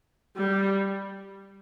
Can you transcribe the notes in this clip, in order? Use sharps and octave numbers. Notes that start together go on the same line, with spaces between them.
G3